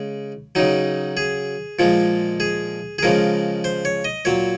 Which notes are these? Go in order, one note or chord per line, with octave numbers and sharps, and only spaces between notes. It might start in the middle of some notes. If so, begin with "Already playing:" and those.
Already playing: C#3 G#3
C#3 F#3 D#4
G#4
A#2 F3 G#3
G#4
G#4
C#3 F3 G#3 A#4
C5
C#5
D#5
A#2 F#3 C#5